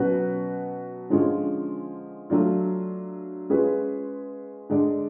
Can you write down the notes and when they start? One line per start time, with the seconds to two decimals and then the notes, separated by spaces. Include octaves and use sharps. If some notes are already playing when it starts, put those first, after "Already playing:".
Already playing: B2 F#3 C#4 F#4 B4
1.10 D3 F3 G#3 C#4 F4
2.30 F#3 A3 D4 F4
3.50 G#3 C#4 F4 G#4 B4
4.69 D3 G#3 D4